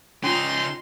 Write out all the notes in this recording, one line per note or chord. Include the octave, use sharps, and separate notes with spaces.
C#3 C#4 D#4 F4 C6